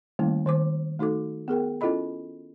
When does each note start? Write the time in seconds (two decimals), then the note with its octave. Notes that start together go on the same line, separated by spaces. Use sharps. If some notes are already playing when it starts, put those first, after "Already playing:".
0.19 D#3 G3 A3 A#3 C#4 E4
0.46 D#3 C5 D6
0.99 A3 D#4 F#4 A4 D6
1.48 B3 G#4 A#4 G5
1.81 C#4 E4 F4 A4 D#5 B5